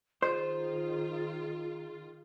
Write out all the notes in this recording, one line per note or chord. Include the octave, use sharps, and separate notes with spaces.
D#3 F4 G#4 C5